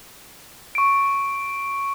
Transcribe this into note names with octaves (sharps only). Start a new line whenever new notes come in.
C#6 D7